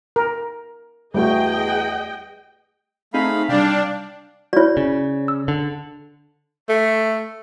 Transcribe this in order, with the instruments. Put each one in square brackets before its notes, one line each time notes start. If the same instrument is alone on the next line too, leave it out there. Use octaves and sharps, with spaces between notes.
[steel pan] A#4
[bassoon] E2 [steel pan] G3 A3 F#4 [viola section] G#4 D#5 G5
[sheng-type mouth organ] A3 F5 B5 [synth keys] C4 D#4 G#4
[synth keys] C3 G3 [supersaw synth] D4 [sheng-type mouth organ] F5 G5
[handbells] E4 F#4 [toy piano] C#5 D5
[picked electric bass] C#3
[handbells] E6
[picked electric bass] D3
[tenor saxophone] A3